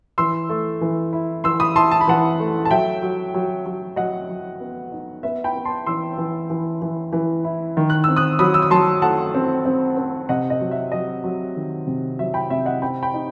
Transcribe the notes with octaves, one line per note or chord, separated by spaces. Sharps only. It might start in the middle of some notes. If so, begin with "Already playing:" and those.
E3 C6 E6
A3
E3
E4
E3 C6 E6
B5 D#6
E4 A5 C6
A5
B5
E3 F#5 A5
A3
A5
F#3 E5 G5
F#3
F#3
F#3
F#3 D#5 F#5
F#3
B3
D#4
B3 E5
G5 B5
B3
A5 C6
E3 C6 E6
E3
E3
E3
E3
E4
D#3
F#6
C4 E6
D#6 F#6
F#3 B5 D#6
E6
D#6
F#3 A5 C6
A3 F#5 A5
C4
C4
C4
C3 D#5 F#5
D#5
F#3
E5
F#3 D#5
F#3
D#3
C3
F#3 E5
G5 B5
C3 E5
D#5 F#5
C4 G5 B5
G5 B5
D#4